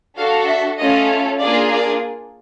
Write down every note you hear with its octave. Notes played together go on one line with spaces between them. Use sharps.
D4 F#4 A4 F5
E5
A3 C#4 F4 A4 D#5
A#3 D4 F4 G#4 D5
D5